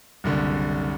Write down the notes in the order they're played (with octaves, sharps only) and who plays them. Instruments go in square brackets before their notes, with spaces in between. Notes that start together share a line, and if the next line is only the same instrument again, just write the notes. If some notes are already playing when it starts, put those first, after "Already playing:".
[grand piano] F#1 C2 D3